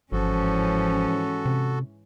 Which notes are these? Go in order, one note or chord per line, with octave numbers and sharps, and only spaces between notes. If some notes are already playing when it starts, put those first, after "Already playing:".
G1 G#2 E3 F3 C#4 F#4 A4
C3